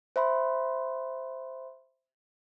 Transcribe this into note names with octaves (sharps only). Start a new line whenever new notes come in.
C5 E5 B5 C6